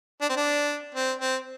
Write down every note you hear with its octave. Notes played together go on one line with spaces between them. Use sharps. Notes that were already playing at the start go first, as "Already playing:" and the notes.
D4
C4
D4
C4
C4